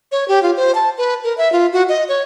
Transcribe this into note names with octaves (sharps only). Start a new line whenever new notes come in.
C#5
G4
F4
C5
A5
B4
A#4
E5
F4
F#4
D#5
C#5